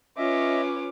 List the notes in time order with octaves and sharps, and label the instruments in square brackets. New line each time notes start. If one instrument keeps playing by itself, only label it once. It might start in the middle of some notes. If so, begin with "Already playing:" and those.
[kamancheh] C#4 D6 [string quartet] F4 B4 C#5 [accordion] D#5 E5